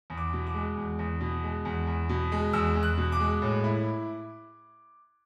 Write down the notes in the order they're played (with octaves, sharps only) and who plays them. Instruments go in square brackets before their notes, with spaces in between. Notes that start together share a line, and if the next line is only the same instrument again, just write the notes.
[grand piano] E2
D6
B2
D6
G#3
E2
E2
B2
G#3
E2
E2
B2
G#3
E2 E6
E2
F#6
B2
D6
G#3
A2
E4